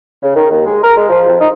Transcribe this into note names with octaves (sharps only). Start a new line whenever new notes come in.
C#3
D#3
D#2
G#3
A#4
G#3
F3
F2
D#4